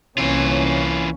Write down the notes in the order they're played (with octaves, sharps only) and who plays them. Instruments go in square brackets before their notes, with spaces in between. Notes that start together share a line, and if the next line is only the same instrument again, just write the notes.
[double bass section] C2 A#3 C#4 [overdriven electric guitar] E3 F4